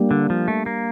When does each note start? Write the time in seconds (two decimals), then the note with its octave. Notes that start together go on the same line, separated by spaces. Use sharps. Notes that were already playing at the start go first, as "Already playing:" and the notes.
Already playing: G3 A#3 D4 G4
0.11 D3
0.30 F3
0.48 A3
0.66 A#3